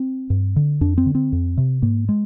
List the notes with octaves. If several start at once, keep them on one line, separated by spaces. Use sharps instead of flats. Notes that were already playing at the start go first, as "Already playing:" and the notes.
Already playing: C4
G2
D3
F2 D4
C4
D3
C4
F2
C3
G#2 A#3
G#3